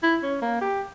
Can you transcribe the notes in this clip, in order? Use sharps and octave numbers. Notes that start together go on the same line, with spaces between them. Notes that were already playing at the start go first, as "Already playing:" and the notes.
E4
C#4
A#3
G4